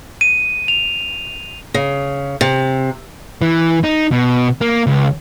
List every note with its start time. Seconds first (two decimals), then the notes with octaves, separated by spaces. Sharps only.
0.21 D#7
0.68 F7
1.74 C#3
2.41 C3
3.42 E3
3.84 D#4
4.12 B2
4.61 A#3
4.87 C#2